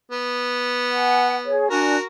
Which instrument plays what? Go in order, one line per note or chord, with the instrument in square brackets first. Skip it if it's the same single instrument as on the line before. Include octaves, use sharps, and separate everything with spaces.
[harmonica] B3
[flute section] F#5 G#5
G#4 C#5
[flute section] D4 G#5 F#6 [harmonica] F#4 A#4